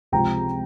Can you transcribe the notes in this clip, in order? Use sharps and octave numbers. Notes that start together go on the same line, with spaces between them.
C#2 C3 F3 C4 G5 A#5